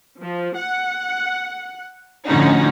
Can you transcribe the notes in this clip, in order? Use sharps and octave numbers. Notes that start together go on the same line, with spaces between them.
F3
F#5
A2 D3 F3 C#4 D#4 F#4